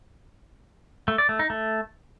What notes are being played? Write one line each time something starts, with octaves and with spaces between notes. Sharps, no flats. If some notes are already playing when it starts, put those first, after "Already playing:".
A3
D5
A3
D#4
A3